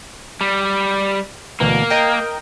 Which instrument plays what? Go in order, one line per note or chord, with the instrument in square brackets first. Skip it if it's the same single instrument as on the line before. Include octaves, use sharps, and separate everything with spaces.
[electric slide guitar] G3
[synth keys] D2 B2 E3 [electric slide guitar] A#3
[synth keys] A#4 D#5 G5